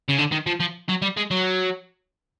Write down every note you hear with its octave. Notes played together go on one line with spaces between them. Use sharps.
C#3
D3
D#3
F3
F3
F#3
G3
G#3
F#3